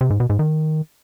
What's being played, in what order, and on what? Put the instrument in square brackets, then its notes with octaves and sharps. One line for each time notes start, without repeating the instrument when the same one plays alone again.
[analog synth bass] C3
G#2
B2
G#2
D#3